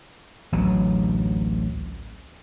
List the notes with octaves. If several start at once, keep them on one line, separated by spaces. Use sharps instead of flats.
A1 D2 F#3